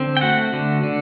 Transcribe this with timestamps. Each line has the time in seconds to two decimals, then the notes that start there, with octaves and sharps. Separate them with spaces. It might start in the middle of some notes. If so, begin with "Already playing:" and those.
Already playing: D3 C4
0.17 G5
0.21 A3 F#4 F#5
0.53 D3
0.84 D3